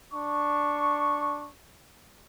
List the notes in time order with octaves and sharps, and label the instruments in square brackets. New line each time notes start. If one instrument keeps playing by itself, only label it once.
[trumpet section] D4 C#6